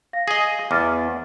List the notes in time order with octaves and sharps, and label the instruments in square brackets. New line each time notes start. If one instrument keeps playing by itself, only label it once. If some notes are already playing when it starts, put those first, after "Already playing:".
[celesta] F5 A#6
[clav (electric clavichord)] G#4 D#5
[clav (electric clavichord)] E2 [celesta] D6 F6 A6